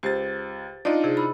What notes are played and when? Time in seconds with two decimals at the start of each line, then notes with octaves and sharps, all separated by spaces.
0.03 C#2 G4 C5 A6
0.85 D4 D#4 F4 D5 D#5
1.04 C3 G#4
1.17 E4 B5